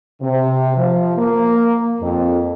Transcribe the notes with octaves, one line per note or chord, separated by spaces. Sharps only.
C3
F3
A#3
F2